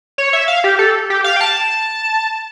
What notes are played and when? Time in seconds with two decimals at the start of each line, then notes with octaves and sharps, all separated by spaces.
0.18 C#5
0.33 E5
0.48 F5
0.64 G4
0.79 A4
1.10 G4
1.24 F5
1.36 G5
1.41 A5